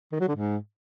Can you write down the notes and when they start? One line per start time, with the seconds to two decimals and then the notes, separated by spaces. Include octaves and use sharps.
0.12 D#3
0.20 F#3
0.28 D3
0.35 G#2